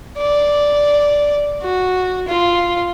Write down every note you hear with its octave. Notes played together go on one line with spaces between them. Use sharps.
D5
F#4
F4